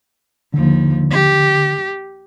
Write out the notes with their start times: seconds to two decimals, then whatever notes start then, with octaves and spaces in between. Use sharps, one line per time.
0.54 D#2 D3 F3
1.11 G4